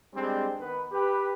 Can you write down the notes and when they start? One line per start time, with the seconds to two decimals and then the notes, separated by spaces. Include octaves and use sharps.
0.14 G3 G#3 C4 D4
0.59 D#3 B3 B4
0.92 G4 B4